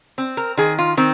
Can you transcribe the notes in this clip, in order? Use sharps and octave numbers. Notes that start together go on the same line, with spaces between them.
C4
A#4
D#3 G#4
F4
D#3 C4